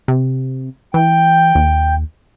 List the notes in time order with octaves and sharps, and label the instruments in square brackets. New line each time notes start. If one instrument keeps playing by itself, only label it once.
[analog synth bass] C3
[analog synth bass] E3 [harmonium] G5
[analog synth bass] D#2